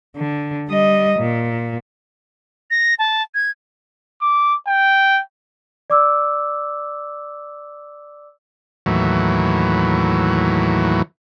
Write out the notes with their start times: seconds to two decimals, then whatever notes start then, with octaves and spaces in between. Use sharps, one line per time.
0.16 D3
0.69 G3 D#5
1.19 A#2
2.71 A#6
2.99 A5
3.34 G#6
4.21 D6
4.67 G5
5.90 D5 D6 E6
8.86 D#2 A2 E3 F#3